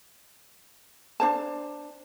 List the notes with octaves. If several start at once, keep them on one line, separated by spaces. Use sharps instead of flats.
D4 C5 A5